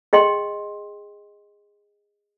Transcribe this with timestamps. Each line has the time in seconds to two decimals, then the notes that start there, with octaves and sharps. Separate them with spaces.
0.13 G#4 D#5 G5 C6